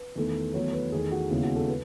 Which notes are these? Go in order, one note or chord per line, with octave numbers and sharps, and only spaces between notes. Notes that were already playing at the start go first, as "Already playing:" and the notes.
Already playing: B4
E2 D#3 A3
E2 D#3 F#3 A3 C#5
B4
E2 D#3 A3 G#4
F#4
D#2 C#3 G#3 B3 E4
F#4
A4
B4